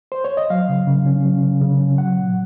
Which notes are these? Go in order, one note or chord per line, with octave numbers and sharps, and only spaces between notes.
C5
C#5
D#5
F#3 F5
C#3
C#3
C#4
F#3
C#3
C#3
C#4
F#3 F#5
A#2